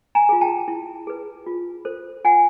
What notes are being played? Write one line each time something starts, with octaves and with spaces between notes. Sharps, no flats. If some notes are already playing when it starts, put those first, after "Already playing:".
G#5 A#5
F4 G#4
G5 A5
E4
G#4 B4
F4
A4 C5
F4 F#5 G#5